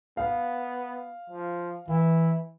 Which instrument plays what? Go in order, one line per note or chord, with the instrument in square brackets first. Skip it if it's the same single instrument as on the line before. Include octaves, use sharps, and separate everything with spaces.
[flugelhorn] B3 [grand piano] F5
[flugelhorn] F3
[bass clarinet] E3 [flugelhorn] E4